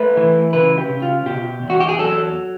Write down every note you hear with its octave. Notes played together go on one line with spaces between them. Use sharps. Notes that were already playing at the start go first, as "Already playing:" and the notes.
Already playing: A3 B4
E3
C#3 B4
G4
C#3
F4
B2 G4
E2
F#4
G4
G#4
F#3 A4